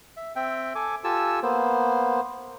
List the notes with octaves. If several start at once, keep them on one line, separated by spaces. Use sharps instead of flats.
E5
C4 E5 G5
A4 G#5 D6
F4 G4 A4 G#5 A5 E6
A#3 B3 C5